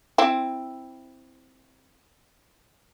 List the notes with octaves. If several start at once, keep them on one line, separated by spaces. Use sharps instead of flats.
C4 E4